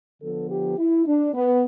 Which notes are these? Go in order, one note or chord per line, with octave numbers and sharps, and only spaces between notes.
D3 F3 B3 A4
G4
E4
D4
B3